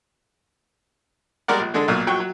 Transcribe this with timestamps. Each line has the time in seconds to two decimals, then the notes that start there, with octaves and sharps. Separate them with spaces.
1.48 G3 G#3 A#4 D5 F#5
1.60 A#1
1.74 D3 G#3 D4 A4
1.88 B1 A#2
2.07 A#1 F#3 G5 C#6
2.20 F#3